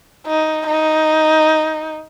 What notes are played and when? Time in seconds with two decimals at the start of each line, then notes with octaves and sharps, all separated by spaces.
0.26 D#4
0.67 D#4